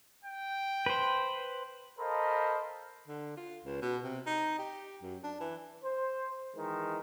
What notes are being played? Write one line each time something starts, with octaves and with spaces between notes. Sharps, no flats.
G5
B4 C5
A4 A#4 C5 D#5 F5 B5
D3
F4
C#2
B2
C3
D#4
G4
F#2
D4
E3
C5
D#3 E3 G#3